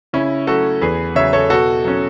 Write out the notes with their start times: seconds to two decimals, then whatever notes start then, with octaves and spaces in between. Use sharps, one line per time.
0.13 C#3 C#4 E4
0.47 F#3 A3 F#4 A4
0.81 E2 G#4 B4
1.15 C#3 F#3 C#5 E5
1.33 A4 C#5
1.50 B2 F#4 A4
1.85 F#3 C#4